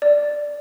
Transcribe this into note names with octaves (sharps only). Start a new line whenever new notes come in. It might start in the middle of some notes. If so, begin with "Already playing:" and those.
D5